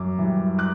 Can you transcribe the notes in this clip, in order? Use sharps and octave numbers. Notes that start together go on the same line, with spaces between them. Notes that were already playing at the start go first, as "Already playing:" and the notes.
Already playing: F#2 D6
E3 G3
D6 F#6